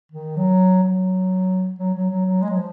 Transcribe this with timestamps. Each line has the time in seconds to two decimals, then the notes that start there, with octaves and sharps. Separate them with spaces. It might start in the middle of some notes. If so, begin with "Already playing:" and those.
0.12 D#3
0.36 F#3
0.83 F#3
1.79 F#3
1.94 F#3
2.10 F#3
2.26 F#3
2.42 G#3
2.50 F#3
2.57 F3